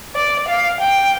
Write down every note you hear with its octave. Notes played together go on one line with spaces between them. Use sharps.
D5
F5
G5